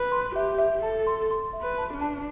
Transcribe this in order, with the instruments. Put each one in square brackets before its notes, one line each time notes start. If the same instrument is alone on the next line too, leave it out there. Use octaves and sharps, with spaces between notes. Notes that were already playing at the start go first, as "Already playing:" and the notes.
Already playing: [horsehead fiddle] B4
[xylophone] C6
[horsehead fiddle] G4 [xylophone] E5
[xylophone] E5
[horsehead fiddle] A4 [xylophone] A5
[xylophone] C6
C6
E5
[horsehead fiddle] B4
[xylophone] A5
[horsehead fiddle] D4
[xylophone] A5